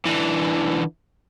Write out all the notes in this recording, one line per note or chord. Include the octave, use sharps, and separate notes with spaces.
D3 E3